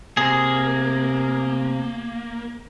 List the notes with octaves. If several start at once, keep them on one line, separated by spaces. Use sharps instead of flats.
C3 A#3 G#4